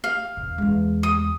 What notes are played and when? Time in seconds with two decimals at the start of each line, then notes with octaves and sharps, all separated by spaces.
0.04 F5
0.37 E2 C3
0.58 E2 G#3
1.03 D#6